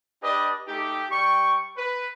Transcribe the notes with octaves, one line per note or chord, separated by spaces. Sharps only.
D4 G4 B4 D5 D#5
A3 D#4 G4
G3 G5 C#6
B4